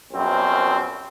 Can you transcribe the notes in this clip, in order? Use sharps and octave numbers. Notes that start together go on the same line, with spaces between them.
A#1 F#2 B2 C4